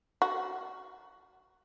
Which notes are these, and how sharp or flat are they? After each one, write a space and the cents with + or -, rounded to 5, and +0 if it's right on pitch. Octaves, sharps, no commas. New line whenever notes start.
F#4 +15